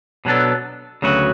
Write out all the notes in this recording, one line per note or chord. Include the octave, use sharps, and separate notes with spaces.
B2 F#3 B3 D4 A4
D2 C#3 F#3 B3 F#4